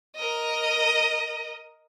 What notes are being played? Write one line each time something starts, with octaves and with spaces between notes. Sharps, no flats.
A#4 D#5